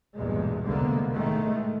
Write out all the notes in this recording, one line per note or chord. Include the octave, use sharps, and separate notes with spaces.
B1 E2 G2 A#2 G#3
C2 B2 D3 G#3 A#3 B3
A2 D#3 G#3 A3